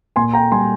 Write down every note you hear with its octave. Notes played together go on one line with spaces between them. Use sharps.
A#2 G#5 C6
G5 A#5
G3 G#5 C6